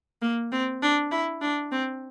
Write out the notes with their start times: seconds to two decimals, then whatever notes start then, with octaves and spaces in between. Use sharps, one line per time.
0.22 A#3
0.52 C4
0.83 D4
1.11 E4
1.41 D4
1.72 C4